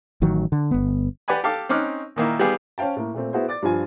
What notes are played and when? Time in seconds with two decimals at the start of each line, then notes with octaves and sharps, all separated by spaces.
0.22 A1 D#3 F#3
0.52 D3
0.71 G1 B3
1.28 G4 B4 D5 F#5 G#5 B5
1.44 G4 A4 F5 D6
1.69 C4 C#4 D#4 D6 F6 F#6
2.16 A#2 D#3 A#3 E4
2.40 G3 B3 F4 G4 G#4
2.78 C#4 C5 F5 G5 A5
2.96 A2 A#3
3.14 A#2 A3 C4
3.33 B3 E4 F#4 G#4 B4 C5
3.48 D5 D6 A6
3.62 G2 F3 D4 F4 G#5